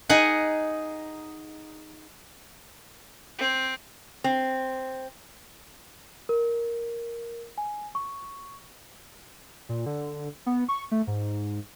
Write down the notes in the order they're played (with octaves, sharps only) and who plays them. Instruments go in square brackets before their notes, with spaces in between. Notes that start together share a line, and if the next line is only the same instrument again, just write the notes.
[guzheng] D#4 G#4 F#5 G#5
[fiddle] C4
[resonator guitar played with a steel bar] C4
[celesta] A#4
G#5
C#6
[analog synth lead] A#2
D3
B3
C#6
A3
G#2